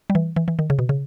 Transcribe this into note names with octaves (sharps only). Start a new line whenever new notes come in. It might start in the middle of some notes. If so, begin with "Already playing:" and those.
G3
E3
E3
E3
D#3
C#3
B2
C#3